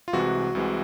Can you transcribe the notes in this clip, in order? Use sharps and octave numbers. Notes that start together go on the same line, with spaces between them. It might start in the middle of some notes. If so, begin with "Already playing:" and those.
F4
C2 C3 E3 G#3 F#4
C2 C3 E3 G#3